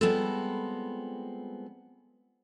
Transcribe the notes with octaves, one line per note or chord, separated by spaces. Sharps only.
G3 G#3 B3 C4 F4 A4